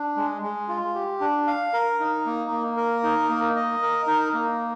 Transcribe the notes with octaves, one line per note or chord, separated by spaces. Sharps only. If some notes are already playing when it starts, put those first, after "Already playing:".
Already playing: D4
G#3
G#3
F4
G4
D4
F5
A#4
D#4
A#3
A#3
A#4
D#4
A#3
D#5
A#4
D#4
A#3